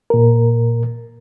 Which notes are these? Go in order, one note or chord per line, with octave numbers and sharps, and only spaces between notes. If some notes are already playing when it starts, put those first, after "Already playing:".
A#2 A#4